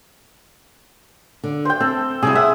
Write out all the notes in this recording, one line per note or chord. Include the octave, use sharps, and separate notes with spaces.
D3
C5 G5
C4 A4
C3 G3 E4 G#4
E5 F#5